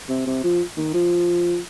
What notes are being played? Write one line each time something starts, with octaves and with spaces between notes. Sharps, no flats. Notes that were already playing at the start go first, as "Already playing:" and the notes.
C3
C3
F3
D#3
F3